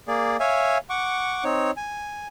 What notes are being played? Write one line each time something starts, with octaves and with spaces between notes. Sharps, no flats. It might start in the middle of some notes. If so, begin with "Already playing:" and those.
A#3 G#4 D5
C#5 E5 F5 G#5
F#5 C#6 D6
C4 D#4 C#5
G#5